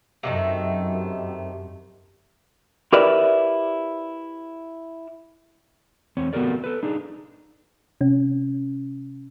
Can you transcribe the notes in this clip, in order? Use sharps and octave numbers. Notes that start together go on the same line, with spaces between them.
F#2 C3 D#3 A3
E4 G4 A#4 B4 D5 E5
E2 C4 C#5
B3 F#4 G4 A4 A#4 D5
A4 B4
D4 D#4 G#4
C3 C#4